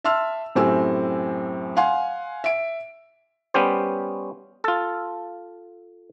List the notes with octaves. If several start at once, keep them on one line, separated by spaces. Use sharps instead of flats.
E5 A5 C6 E6 F6
F#2 A2 C4 G4 G#5 E6
F5 F#5 G#5 C6
E5 D7
G3 B3 C#4 G4 C5
F4 A4